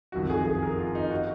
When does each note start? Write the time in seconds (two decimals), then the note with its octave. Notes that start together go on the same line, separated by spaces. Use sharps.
0.12 F#1 F2 D#3 F#3 F#4
0.30 G#4
0.45 G#4
0.62 A#4
0.79 F4
0.95 D#4
1.11 F#4